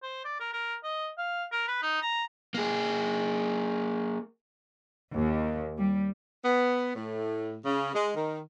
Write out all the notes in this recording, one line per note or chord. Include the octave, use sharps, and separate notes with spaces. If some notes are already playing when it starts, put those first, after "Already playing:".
C5
D5
A#4
A#4
D#5
F5
A#4
B4
D#4
A#5
A#3 G#4
D#2
G3
B3
A2
C#3
G#3
D#3